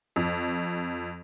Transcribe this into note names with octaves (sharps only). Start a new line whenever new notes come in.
F2